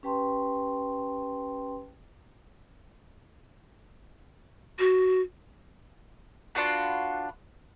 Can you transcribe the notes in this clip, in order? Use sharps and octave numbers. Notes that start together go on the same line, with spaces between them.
C#4 G4 B4 G5 A5 C6
F#4
D4 F4 F#4 B4